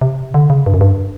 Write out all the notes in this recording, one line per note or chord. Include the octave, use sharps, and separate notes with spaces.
C3
D3
C#3
G2
F#2
G2